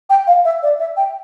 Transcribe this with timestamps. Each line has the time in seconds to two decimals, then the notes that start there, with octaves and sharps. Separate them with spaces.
0.10 G5
0.27 F5
0.45 E5
0.63 D5
0.80 E5
0.97 G5